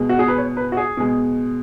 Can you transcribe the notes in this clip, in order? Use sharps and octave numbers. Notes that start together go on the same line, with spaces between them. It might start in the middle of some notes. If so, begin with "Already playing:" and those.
Already playing: B2 G#3
F#4
G#4
B4
C#5
B4
F#4
G#4
B2 G#3